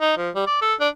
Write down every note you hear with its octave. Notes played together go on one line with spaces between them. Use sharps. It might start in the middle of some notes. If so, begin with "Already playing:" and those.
D#4
F3
G3
D5
A4
D4